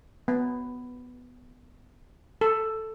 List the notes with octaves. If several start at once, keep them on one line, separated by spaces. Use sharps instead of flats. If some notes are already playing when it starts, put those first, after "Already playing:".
B3
A4